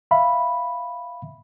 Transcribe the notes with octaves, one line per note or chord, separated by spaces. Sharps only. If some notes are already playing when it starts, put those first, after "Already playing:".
E5 F5 B5